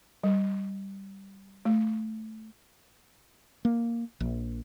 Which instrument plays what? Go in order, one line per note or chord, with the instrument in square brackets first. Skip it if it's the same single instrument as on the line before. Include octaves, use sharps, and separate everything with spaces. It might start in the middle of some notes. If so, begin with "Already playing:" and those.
[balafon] G3
A3
[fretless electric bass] A#3
A#1